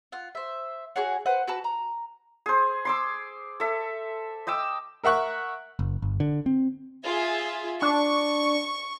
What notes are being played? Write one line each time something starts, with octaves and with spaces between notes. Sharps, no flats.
F4 F#5
C5 E5
F#4 G#4 C#5 F#5
B4 C5 F#5
F#4 B4 A5
A#5
G#4 C5
C6 D6 E6
A4 E5
D#5 G5 D6 E6
A#4 E5 F#5 C#6 F#6
F#1
G1
D3
C4
F4 G#4 E5
D4 C#6